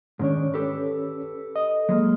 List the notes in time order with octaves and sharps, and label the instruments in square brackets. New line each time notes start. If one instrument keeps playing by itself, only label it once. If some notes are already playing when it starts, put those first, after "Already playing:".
[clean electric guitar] G#2 D#3 D4 [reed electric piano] C#4 C#5
[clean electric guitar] G4 A4 B4
[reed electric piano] D#5
[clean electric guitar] F#3 G#3 A#3